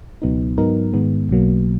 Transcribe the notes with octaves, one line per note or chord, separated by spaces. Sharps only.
C#2 B2 F#3 B3 D#4
G#2 F#3 B3 D#4 A#4
G#2 D#3 G#3 B3
B1 B2 F#3 A#3